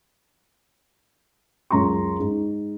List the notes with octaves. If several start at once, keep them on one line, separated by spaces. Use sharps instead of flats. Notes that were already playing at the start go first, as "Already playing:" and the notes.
C#2 F#2 A#5 C6 C#6
G#2